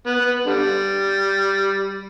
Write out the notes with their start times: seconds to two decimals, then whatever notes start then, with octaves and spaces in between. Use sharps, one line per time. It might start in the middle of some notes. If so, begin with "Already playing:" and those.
0.07 B3
0.19 B3
0.46 D3 G3